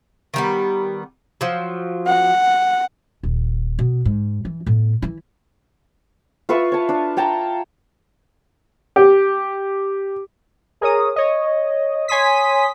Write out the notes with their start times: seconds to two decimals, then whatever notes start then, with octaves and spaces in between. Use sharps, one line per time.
0.34 D#3 G3 B3
1.41 F3 F#3
2.07 F#5
3.23 D#1
3.79 B2
4.05 G#2
4.45 E3
4.66 A2 B3
5.02 E3 E4
6.49 F4 B4 E5 C#6
6.72 C#5 A5
6.89 D4
7.17 C#5 G5 A5 A#5
8.96 G4
10.81 G#4 A#4 C#5 D#6
11.16 C#5 D#5
12.08 C#5 G#5 C6 D#6 B6